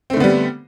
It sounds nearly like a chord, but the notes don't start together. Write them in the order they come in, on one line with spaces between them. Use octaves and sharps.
C4 A3 D3 B3 G3